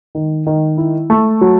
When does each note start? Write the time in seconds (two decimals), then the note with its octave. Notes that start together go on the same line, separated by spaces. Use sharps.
0.15 D#3
0.47 D#3
0.77 E4
1.10 A3
1.41 F#3